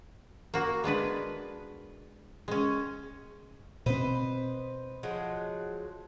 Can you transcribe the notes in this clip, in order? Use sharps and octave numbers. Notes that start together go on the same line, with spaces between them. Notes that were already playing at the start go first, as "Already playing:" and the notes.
A#3 F#4
G#3 B3 D4 B4
G#3 C#4
B2 C4 B4 C5 D#5
F3 F#3 G#3